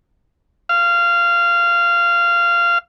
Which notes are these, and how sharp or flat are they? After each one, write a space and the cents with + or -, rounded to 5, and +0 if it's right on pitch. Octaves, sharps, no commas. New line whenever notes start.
F5 -15